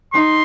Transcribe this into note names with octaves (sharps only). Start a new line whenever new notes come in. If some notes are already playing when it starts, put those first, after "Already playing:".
D#4 C6